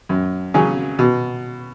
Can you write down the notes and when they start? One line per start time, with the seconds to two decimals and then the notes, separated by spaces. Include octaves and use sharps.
0.09 F#2
0.54 C#3 F#3 C#4 G#4
0.99 B2